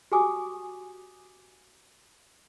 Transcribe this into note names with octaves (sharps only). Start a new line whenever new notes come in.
F#4 G4 G#5 D6 D#6